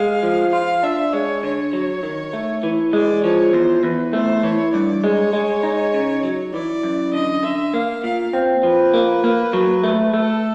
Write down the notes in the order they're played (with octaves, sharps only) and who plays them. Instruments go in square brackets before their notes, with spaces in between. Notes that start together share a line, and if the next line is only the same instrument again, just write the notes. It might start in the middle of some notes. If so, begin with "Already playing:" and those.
Already playing: [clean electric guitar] G#3 [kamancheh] F5
[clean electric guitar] F3
[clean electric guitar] F4 [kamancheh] F5
[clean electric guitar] D4 [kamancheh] E5
[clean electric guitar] G#3 [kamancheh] C#5
[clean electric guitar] D3 [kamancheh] C#5
[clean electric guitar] F#3
D#3
A3
E3
[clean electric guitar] G#3 [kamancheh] D5
[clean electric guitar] F3 [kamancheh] C#5
[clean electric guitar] E2 [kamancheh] C5
[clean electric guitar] E2 [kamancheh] B4
[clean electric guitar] A3 [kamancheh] C5
[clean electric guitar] E3 [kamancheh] C#5
[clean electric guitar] G2 [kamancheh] D5
[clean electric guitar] G#3 [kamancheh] C#5
[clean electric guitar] G#3
D#4
C#3
F#3
[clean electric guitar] E3 [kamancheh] D5
[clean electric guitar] F#2
[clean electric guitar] D3 [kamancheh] D#5
[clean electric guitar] D3 [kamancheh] E5
[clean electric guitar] A#3 [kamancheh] F5
[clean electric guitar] A#2 [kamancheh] F5
[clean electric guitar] C4
[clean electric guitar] F3 [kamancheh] B4
[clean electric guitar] A#3
A#3
F#3
A3
[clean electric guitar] A3 [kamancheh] A4